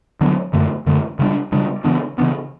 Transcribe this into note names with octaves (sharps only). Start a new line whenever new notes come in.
D3 F#3 B3 D4
F#2 D3 A3
F#2 D3 A3
C#3 G3 D4
C#3 G3 D4
C#3 E3 B3 D4
C#3 E3 B3 D4